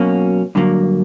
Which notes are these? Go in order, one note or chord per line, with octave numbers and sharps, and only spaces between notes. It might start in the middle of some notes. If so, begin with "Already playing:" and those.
Already playing: B2 F#3 A#3 C#4
G2 D3 F#3 A#3